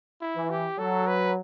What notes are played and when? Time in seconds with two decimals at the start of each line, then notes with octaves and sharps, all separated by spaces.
0.21 E4
0.35 E3
0.50 G4
0.78 F#3 A4
1.07 B4